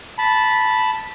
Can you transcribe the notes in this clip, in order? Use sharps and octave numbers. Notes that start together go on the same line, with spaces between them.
A5 B5